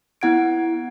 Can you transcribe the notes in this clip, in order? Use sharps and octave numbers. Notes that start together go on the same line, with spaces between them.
B3 E4 F#5 G#6 D7